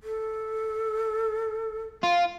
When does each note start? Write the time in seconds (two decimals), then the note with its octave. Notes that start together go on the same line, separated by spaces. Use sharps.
0.03 A4
2.03 F4